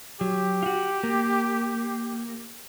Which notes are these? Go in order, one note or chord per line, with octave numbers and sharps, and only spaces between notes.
F#3 G4
F4 F#4
A#3